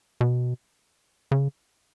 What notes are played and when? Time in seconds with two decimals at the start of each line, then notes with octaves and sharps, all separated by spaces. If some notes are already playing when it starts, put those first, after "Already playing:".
0.21 B2
1.31 C#3